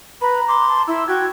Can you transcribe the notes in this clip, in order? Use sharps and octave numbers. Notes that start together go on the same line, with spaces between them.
B4 A#5 B5
C6 D6
A5
E4 C6 E6
F#4 G5 G#6